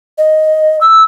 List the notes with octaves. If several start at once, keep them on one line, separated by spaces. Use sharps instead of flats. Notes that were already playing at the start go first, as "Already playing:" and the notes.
D#5
E6